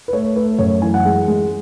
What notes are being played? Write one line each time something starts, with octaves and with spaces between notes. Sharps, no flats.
B4
A3 C#5
A3 B4
F#2 C#5
E3 G#5
F#5
G#3
G#3